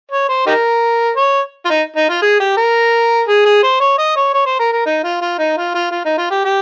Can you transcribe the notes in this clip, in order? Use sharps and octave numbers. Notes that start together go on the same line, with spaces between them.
C#5
C5
D#4 G4 A#4
C#5
F4
D#4
D#4
F4
G#4
G4
A#4
G#4
G#4
C5
C#5
D#5
C#5
C#5
C5
A#4
A#4
D#4
F4
F4
D#4
F4
F4
F4
D#4
F4
G4
G4